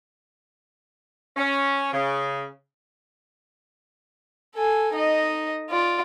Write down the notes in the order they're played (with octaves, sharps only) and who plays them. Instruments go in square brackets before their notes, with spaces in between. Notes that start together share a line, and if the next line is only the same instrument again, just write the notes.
[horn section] C#4
C#3
[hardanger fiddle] A4 G#5
D#4 D#5
F4 D5